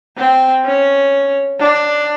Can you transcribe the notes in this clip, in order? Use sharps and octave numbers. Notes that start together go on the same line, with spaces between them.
C4
C#4
D4